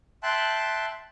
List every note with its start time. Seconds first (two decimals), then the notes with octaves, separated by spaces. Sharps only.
0.23 E5 G5 A5 C6 F#6